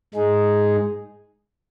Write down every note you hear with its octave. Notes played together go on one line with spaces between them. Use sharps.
G#2 G#3 D#4 G#4